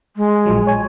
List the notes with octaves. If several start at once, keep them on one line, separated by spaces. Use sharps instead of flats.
G#3
A#1 F3 F#3
C#5 G#5